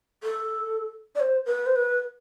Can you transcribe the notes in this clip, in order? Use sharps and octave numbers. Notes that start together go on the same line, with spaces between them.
A4
D5
C5
B4
C5
B4